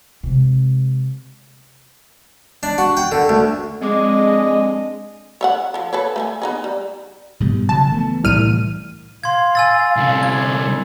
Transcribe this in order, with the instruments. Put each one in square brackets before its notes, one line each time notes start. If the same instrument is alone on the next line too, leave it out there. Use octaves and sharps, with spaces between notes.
[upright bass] C3 G#3
[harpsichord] D4
F#4
G5
D3
D2
[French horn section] F2 D4 D#5 [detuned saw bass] G#3 [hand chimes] C4 D6
[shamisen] C#5 E5 F#5
F3 A4
A4 B4 C#5
A3 C5 G#5
B3 D#4 G#4
G3
[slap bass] G#2 B2 G3
[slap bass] C#3 F#3 [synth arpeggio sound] A5
[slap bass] E3 A3 B3
[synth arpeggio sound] C2 F6 D#7 [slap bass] A2 E3 G3
[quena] F5 [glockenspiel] C6 G#6
[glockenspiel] G#5 E6 A6
[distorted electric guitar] C2 D3
[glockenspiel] G#6